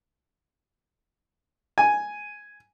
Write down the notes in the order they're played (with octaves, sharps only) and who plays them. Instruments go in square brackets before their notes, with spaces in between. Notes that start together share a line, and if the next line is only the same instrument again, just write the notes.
[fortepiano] G#5